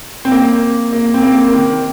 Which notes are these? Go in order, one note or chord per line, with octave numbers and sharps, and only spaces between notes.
C4
A#3
A#3
C4
A#3
D#3